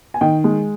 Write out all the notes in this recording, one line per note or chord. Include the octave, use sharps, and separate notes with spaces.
G#5
D#3 D#5 G5
G#3